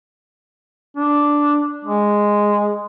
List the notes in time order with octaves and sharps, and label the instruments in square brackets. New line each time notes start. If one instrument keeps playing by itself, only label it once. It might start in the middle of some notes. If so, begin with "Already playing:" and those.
[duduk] D4
G#3